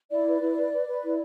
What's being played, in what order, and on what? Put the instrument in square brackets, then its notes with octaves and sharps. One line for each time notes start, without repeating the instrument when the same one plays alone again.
[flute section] E4 D5
B4
E4
B4
B4
B4
E4